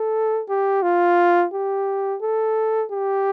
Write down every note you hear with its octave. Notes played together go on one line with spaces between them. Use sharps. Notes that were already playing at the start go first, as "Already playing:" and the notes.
Already playing: A4
G4
F4
G4
A4
G4